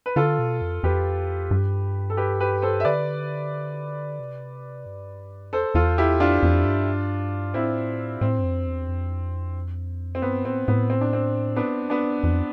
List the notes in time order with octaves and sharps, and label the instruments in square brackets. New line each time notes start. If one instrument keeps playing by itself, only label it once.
[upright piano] B4
[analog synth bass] D3 [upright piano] F4 A4
[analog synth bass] B2
F2
[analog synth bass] F2 [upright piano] G4 B4
[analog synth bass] G2
[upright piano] A4
G4 B4
G4 B4
A4 C5
E5
[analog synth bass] D3 [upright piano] B4 D5
[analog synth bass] C3
G2
[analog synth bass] E2 [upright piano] A4 C5
[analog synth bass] E2 [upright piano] F4 A4
[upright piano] E4 G4
[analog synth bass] F2 [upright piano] D4 F4
[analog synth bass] F2
G2
[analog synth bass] A2 [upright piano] C4 E4
[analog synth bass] A2 [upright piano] C4
[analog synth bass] G2
F2
E2
F2
[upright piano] C4
[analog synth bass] G2 [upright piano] B3
[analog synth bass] A2 [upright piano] C4
[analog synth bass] A2 [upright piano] B3
[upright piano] C4
D4
C4
B3 D4
B3 D4
[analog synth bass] F2